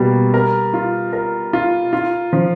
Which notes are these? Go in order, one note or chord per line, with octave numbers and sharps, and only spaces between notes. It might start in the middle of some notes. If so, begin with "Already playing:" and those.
Already playing: B2 G3 A#3
A#4
F4
A#4
F4
F4
F3